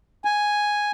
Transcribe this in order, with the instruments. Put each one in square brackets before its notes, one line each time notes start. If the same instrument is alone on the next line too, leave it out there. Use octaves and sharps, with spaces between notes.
[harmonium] G#5